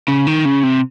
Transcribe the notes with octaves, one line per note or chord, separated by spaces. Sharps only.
C#3
D#3
C#3
C3